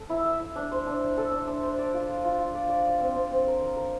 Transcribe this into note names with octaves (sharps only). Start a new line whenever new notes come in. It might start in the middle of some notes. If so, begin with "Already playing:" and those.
Already playing: A4
E4
E5
E4
D4
C5
D4
D4
A4
D4
D4
C5
D5
F4
D5
F4
F4
D5
D5
D5
C4
C4
C4
A#4
A#4
A#4